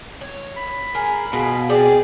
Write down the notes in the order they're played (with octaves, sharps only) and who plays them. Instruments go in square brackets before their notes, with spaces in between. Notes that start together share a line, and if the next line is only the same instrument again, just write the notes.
[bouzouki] C#5
[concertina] B5
[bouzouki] G#4 A#4
[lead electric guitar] B2 [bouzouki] F4 G#4
[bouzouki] C4 D5 [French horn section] G#4